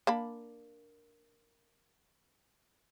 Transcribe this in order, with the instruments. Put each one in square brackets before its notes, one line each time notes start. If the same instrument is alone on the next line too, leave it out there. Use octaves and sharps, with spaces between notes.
[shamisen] A#3 D4 B5